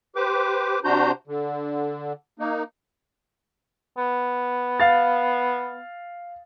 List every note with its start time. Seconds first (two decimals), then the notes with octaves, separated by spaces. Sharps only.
0.16 G4 B4 C5 D6
0.85 C3 D4 F#4 C5 A#5 G6
1.27 D3
2.39 A#3 D#4
3.98 B3
4.80 F5 A6